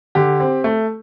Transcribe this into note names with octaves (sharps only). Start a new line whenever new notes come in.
D3 G4
C4
A3